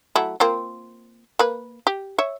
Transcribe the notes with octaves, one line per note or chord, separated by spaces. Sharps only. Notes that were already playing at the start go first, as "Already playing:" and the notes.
F#3 A3 E4
A#3 C4 F4
A#3 B4
G4
C#5 E5